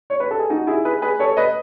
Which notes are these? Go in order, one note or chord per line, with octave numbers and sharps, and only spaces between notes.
C#5
B4
A4
G#4
D#4 F#4
E4 G#4
G#4 B4
G#4 B4
A4 C#5
B4 D#5